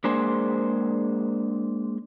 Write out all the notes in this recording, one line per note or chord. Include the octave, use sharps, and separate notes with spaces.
G#3 A#3 D4 G#4 C5